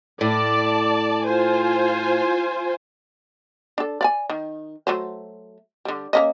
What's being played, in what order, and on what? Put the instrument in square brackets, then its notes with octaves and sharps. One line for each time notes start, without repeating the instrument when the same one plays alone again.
[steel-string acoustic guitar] A2 [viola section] D5 A5
[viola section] F4 C5 G#5
[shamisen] D4 A4
D5 F5 G#5
D#3
F#3 A3 C5
D3 G3
A#3 C#4 D#5